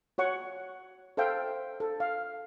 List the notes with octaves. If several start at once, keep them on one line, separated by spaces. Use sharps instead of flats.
F#4 C#5 F#5 C#6
A4 C5 E5 F5 G5
A4
F5